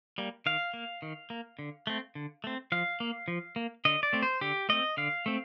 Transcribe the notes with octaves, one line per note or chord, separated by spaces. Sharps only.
G3 A#3
D#3 F5
A#3
D#3
A#3
D3
A3 C4
D3
A3 C4
F3 F5
A#3
F3
A#3
D3 D#5
D5
A3 C4
C5
D3 G4
A3 C4 D#5
D3 F5
A3 C4